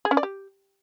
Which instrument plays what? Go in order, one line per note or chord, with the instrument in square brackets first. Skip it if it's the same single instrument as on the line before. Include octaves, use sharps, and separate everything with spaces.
[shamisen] G#4
C#4
D5
G4